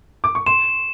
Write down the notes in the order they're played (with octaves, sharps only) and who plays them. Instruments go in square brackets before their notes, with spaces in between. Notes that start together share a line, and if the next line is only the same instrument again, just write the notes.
[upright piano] D6
C#6
[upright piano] C6 [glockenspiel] E7